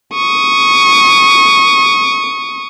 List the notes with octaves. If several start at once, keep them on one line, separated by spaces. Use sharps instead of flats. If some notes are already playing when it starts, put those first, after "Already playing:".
C#6 D#6